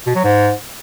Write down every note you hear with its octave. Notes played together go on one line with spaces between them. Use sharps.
B2
F#3
G#2